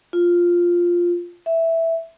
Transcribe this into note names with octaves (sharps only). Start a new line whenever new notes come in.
F4
E5